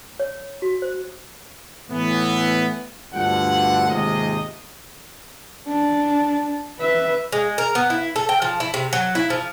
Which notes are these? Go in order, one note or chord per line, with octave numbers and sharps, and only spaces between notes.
C#5
F#4
C5
A2 E3 B3
D2 G2 D3 F3 F4 F#5
D#2 G#2 C3 G#3 F4 D#5
D4
B4 E5
G#3
A#4
B3
E4
A4
G5
F3
E4
C3
F#3
E4
F3